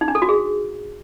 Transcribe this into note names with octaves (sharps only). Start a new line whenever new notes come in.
D#4
D4
A4
F#4
G#4